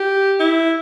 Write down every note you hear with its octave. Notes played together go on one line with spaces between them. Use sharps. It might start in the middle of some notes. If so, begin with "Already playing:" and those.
Already playing: G4
E4